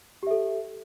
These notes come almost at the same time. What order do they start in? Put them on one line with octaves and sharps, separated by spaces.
G4 E5 A4